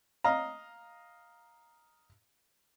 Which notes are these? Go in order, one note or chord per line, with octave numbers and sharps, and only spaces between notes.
D#5 F5 A#5